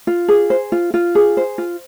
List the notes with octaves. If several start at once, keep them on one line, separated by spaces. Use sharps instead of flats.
F4
G#4
C5
F4
F4
G#4
C5
F4